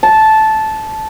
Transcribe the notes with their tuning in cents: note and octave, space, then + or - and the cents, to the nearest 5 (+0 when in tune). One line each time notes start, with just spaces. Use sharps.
A5 -10